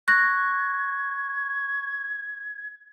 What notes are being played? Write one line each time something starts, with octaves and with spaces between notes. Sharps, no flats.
C#6 F#6 G#6 A#6